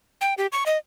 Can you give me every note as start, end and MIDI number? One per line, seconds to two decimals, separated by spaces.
0.21 0.34 79
0.38 0.47 67
0.52 0.64 85
0.66 0.78 75